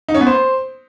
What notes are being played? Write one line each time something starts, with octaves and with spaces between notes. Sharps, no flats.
D#4
C#4
B3
C5